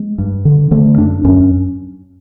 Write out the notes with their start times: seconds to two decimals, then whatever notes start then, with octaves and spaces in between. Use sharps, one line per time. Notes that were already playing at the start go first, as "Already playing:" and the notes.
Already playing: G#3
0.18 G2
0.45 D3
0.71 D3 A3
0.97 F#2 D4
1.24 F#2 C#4